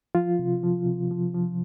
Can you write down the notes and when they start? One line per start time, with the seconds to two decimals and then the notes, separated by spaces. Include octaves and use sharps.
0.15 F3 F4
0.39 C3
0.63 F3
0.86 C3
1.11 F3
1.34 F3